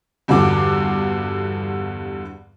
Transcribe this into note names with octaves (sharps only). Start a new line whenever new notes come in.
E2 G2 D3 F#4 D6